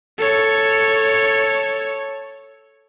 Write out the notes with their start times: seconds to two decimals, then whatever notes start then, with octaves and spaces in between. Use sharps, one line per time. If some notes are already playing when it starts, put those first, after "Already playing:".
0.18 A4 C#5